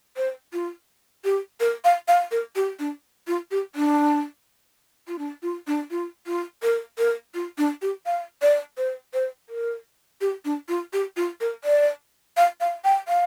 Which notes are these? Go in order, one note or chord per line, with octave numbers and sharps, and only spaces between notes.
C5
F4
G4
A#4
F5
F5
A#4
G4
D4
F4
G4
D4
F4
D4
F4
D4
F4
F4
A#4
A#4
F4
D4
G4
F5
D5
C5
C5
A#4
G4
D4
F4
G4
F4
A#4
D5
F5
F5
G5
F5